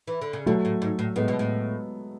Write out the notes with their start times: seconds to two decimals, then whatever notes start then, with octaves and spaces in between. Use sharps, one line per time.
0.07 E3
0.22 D3
0.33 C#3
0.46 B2 F#3 A3
0.65 A2
0.82 G#2
0.99 A2
1.16 A2 G#3 B3
1.28 B2
1.39 A2